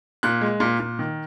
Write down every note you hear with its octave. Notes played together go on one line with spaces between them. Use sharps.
A#2 F#6
G#3
A#2
A#2
D#3